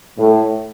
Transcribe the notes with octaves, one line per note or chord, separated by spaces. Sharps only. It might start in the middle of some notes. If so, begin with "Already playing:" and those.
A2